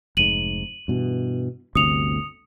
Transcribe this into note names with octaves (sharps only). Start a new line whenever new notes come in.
F1 G#2 D#7 F#7
G2 B2 E3
G1 D2 C3 D#6 C#7 F7